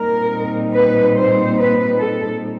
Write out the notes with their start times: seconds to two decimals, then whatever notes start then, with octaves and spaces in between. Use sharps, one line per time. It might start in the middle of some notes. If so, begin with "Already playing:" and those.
Already playing: A#2 G3 C4 D#4 A#4
0.73 B4
1.16 C5
1.57 B4
1.98 A4